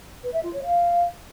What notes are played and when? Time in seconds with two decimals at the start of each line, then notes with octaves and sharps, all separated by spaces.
0.24 B4
0.34 E5
0.43 F4
0.53 C#5
0.63 F5